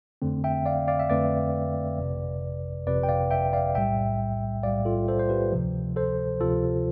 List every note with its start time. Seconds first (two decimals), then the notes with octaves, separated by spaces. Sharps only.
0.22 F2 D3 A3 C4
0.44 E5 G5
0.66 D5 F5
0.88 D5 F5
0.99 E5
1.10 F2 D3 A3 C4 B4 D5
1.98 G1 F2 C3
2.87 G1 F2 C3 B4 D5
3.03 G5
3.09 D5 F5
3.31 E5 G5
3.53 D5 F5
3.75 B1 A2 G3 E5 G5
4.63 B1 A2 G3 D5 F5
4.85 F4 A4
5.08 A4 C5
5.19 C5
5.29 G4 B4
5.52 D2 C3 F3
5.96 A4 C5
6.41 D2 C3 F3 F4 A4